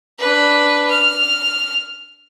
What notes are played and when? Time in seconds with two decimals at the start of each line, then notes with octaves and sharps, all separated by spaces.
0.19 D4 B4
0.90 F6